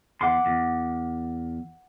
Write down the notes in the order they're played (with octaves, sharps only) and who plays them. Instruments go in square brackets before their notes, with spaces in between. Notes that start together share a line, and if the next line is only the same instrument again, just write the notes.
[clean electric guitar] E2 C6 [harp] F#5 D6
[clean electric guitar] E2